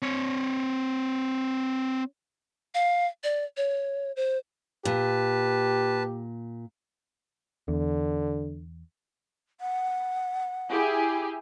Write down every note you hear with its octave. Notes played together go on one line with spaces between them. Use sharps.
C4 C#5
F5
D5
C#5
C5
A#2 G4 B4 A5
E2 D3
F#5
E4 G4 G#4